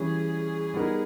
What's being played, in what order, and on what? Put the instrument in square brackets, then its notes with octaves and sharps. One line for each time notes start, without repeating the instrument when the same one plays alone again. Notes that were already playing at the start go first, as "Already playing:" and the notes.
Already playing: [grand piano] E3 G3 C#4 [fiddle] G#4
[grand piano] G3 B3 D#4 A#4